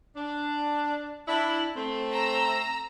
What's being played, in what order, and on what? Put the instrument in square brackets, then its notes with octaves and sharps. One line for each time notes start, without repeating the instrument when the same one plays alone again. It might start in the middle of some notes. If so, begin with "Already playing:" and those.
[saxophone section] D4
D4 E4
A3 C4
[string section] A#5 E6